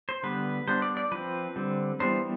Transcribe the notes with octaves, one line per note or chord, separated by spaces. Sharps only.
C5
D3 G3 B3 B4
G3 B3 D4 C5
D5
D5
F3 C4 B4
D3 G3 C4
E3 G3 B3 D4 C5